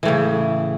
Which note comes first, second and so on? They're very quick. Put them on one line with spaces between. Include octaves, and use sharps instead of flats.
E3 A2 C#3